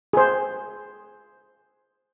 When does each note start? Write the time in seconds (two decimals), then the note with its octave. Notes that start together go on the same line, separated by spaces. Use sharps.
0.13 G#4 C5